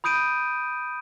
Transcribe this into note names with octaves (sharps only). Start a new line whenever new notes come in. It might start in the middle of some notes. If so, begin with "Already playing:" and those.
B5 D#6 G6 D7 D#7